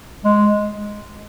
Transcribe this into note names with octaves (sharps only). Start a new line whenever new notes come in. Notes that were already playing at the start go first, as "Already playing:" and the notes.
G#3